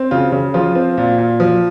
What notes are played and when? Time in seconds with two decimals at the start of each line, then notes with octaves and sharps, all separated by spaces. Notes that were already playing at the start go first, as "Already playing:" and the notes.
Already playing: C4
0.11 C#3 F4
0.32 C#3
0.54 F3 F4
0.75 C4
0.98 A#2
1.18 A#2
1.40 F3